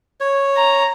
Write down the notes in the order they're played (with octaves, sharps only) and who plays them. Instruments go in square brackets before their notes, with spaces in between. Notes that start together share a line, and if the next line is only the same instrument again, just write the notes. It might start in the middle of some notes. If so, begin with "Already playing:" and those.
[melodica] C#5
[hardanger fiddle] A#5